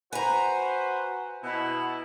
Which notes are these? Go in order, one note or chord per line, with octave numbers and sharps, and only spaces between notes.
F#4 B4 C5 G#5 A#5
B2 E4